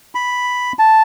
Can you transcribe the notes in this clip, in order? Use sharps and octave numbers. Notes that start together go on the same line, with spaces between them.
B5
A5